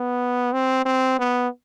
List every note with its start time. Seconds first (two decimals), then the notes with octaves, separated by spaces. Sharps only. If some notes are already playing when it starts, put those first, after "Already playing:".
Already playing: B3
0.53 C4
0.86 C4
1.19 B3